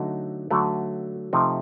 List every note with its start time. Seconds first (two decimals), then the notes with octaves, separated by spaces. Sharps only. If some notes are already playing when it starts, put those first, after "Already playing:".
Already playing: D3 F#3 A3 D#4
0.51 D3 F#3 A3
1.33 C3 F3 A3 D#4